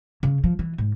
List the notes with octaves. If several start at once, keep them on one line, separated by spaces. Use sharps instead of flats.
C#3
F3
E3
G#2